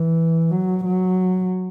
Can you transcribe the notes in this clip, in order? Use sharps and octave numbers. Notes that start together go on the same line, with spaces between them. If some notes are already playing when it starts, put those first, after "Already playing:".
Already playing: E3
F#3
F#3